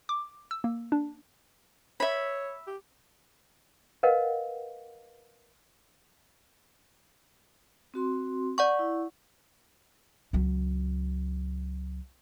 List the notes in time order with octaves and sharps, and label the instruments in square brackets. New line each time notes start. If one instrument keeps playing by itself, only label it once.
[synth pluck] D6
E6
A#3
D4
[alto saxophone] C#5 [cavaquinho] E5 B5
[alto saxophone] G4
[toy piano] A#4 B4 D#5 F5 F#5
[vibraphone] C4 F#4 C6
[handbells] D5 F#5 C#6
[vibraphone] E4
[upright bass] C#2 F#3